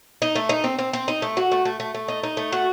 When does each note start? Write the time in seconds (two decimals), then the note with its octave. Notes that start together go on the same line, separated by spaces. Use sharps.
0.22 D#4
0.35 A3
0.49 D#4
0.64 C4
0.79 C4
0.93 C4
1.08 D#4
1.22 A3
1.37 F#4
1.51 A3
1.65 A3
1.80 A3
1.94 A3
2.08 D#4
2.23 D#4
2.37 A3
2.52 F#4